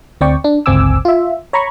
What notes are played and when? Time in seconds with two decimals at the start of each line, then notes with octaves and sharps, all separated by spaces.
0.21 D2 C4 D5 G5 C#6
0.44 D4
0.66 G1 C#2 C4 G#5 D6 E6
1.05 F4 E5
1.53 C#5 A#5 B5 C#6